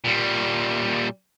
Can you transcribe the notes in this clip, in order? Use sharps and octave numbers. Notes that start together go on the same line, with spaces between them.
A#2 G3